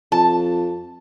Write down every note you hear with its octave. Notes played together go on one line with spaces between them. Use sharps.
F2 A5